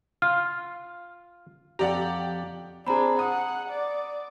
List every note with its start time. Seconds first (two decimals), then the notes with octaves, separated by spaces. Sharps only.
0.22 F4 F6
1.79 F2 G4 D5 F#5 A#5
2.87 C4 D4 G#4 A#5 B5
3.19 F#5 D#6
3.71 D5